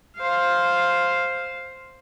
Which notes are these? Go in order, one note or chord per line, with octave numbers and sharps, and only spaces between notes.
C5 F5